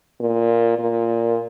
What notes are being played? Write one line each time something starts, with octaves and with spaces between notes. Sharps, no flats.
A#2
A#2